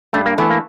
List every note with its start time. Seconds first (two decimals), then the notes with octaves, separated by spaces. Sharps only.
0.13 G2 A3
0.26 A#3
0.38 E3 A3 B3
0.50 A#3